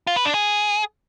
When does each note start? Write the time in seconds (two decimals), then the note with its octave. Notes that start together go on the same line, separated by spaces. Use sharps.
0.07 F4
0.16 B4
0.25 D4
0.34 G#4